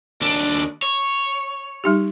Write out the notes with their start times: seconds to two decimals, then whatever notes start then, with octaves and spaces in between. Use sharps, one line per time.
0.21 D#2 D4
0.82 C#5
1.84 G3 D#4 G4